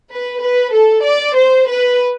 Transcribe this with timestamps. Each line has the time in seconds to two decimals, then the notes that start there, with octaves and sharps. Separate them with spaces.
0.10 B4
0.41 B4
0.73 A4
1.04 D5
1.36 C5
1.68 B4